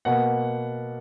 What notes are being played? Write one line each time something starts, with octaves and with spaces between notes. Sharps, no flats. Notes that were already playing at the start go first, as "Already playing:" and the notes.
B2 A#3 F#5